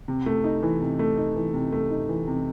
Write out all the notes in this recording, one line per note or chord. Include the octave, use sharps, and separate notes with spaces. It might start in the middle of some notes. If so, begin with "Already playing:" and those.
C3
A3
D#4
E3
C3
A3
D#4
E3
C3
A3
D#4
E3
C3